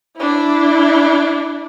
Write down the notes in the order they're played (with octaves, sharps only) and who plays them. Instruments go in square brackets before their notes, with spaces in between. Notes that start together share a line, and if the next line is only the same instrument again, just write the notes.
[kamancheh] D4 E4